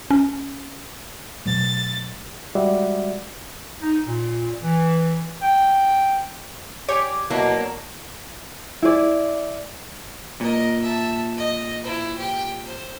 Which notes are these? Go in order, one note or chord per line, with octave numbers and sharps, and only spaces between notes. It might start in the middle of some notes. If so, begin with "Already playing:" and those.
C#4
B2 F#3 A3 A6
G3 G#3 F#4 D5 E5
D#4
A#2
E3
G5
G4 G#4 C#5 D5
B2 F#3 A#3 D4 E4
E4 G#4 D5
A#2 A#4 D#5
E5 A5
D#5
E4 C5
G4 G5
C5